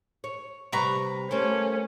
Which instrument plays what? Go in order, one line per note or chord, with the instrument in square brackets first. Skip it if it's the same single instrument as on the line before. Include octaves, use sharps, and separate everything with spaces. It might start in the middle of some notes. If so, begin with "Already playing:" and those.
[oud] C#5
[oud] C3 G3 [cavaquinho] B4 A#5 C#6
[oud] A3 A#3 C5 [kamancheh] C#4